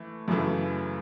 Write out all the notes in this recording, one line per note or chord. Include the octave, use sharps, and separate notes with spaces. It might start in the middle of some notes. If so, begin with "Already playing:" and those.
Already playing: E3 A3
F#2 C#3 E3 A3